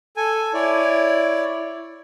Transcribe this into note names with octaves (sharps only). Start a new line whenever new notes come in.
A4 G#5
E4 C#5 D5